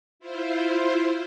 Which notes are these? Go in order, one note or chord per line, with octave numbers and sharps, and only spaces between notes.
E4 F4 C5